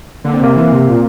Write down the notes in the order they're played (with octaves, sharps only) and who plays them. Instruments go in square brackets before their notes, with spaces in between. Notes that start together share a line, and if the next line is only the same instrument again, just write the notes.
[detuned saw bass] D3 [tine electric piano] A#3
[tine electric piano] C4
[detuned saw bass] C3 [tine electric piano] A#3
[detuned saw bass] E3
C3
A#2